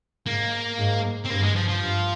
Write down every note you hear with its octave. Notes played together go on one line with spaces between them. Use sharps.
G#2 A#3
G#2
C4
G2 A#3
G#3
F3
F3
G2